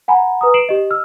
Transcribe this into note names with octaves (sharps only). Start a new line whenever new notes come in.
F#5 G#5 A#5 B5
B4 A#5 D#6
C7 D7 E7 F#7
G4 D#5
E6 F6